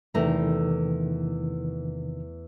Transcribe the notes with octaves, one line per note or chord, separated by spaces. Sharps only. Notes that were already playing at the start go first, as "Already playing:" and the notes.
E2 C3 D#3 E3 A3 A#5